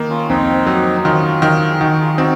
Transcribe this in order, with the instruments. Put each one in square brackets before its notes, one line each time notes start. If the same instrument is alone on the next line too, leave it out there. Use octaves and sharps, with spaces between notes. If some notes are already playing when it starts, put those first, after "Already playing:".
Already playing: [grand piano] D#3 A#3
[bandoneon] C#4 F4
[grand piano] F2 [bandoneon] C4 D#4
[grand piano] F#3
[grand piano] D#3 [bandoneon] C#4 F4
[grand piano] D#3
[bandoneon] G#4
[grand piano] D#3 [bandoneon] D#4 F#4
[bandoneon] F#4
F4 G#4
[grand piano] C4 [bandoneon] D#4 F#4